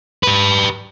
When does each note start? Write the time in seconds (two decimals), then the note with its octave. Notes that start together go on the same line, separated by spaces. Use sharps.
0.23 G4 B4